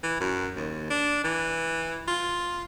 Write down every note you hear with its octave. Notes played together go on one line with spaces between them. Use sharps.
E3
F#2
D#2
D4
E3
F4